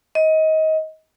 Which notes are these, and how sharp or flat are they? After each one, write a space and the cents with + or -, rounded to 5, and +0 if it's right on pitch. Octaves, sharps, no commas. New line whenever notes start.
D#5 +25